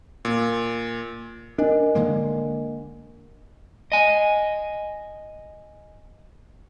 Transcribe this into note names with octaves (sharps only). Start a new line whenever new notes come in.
A#2
D4 A#4 D#5 G#5
D3 G#3 A#3
D#5 G#5